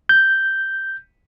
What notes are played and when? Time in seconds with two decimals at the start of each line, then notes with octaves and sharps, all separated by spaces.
0.09 G6